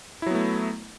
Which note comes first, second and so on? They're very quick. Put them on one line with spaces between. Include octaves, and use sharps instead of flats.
E4 F#3 B3 A3